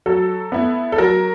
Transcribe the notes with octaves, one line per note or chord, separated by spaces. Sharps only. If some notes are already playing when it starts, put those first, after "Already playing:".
F#3 A4
B3 E4
A4
F#3 A#4